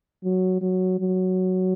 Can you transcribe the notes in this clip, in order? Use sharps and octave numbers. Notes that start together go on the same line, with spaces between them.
F#3
F#3
F#3